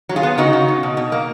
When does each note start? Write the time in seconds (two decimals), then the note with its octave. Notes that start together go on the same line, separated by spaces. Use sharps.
0.09 F#3
0.16 F4 G#4
0.23 B3
0.38 C#3 D#4 F#4
0.53 C#3
0.68 B3
0.83 B2
0.97 B2
1.12 A#3